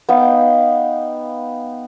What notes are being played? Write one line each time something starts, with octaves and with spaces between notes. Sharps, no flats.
B3 D#4 F5 G5